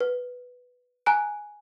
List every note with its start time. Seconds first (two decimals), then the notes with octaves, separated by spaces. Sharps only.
0.01 B4
1.06 G#5 A#5 F#6 D7